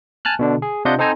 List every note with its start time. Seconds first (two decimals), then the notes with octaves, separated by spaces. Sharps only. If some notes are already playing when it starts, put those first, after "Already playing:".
0.25 G#5 A5 F6 F#6
0.39 B2 D3 D4
0.62 G#4
0.85 C3 D4 F4 D#5 F#5 G6
0.98 C4 D#4 A4 C5 G#5 A#5